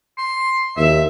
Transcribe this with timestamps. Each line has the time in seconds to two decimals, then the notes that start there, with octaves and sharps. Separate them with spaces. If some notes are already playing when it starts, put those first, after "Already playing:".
0.18 C6
0.77 D#2 E5